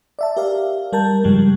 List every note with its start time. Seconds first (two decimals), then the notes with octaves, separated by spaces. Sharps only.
0.19 D5 E5 A5
0.37 G4 A#4 D5 E5 F5
0.93 G3 A#4 A5 G6
1.24 G2 C#3 F3 G3 G#3